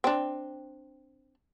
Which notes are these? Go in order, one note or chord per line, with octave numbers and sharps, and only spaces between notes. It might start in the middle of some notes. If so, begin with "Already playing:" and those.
C4 D4